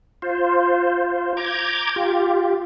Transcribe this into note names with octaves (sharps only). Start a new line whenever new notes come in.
F4 C5
A#5 D6 G6 G#6
F4 G4